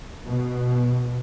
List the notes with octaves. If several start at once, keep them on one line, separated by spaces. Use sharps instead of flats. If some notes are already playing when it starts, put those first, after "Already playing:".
B2